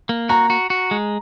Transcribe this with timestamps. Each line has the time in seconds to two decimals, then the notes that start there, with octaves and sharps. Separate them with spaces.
0.09 A#3
0.29 F#4 A#5
0.50 F#4
0.70 F#4
0.91 G#3